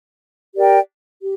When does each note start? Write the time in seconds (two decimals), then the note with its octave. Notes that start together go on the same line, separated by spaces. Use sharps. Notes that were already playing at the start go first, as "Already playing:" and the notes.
0.55 G4 A#4 D5 G5
1.21 G4